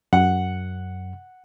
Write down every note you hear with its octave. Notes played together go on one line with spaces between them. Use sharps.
F#2 F#5